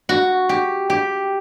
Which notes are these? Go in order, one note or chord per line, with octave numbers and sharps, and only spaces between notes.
F#4
G4
G4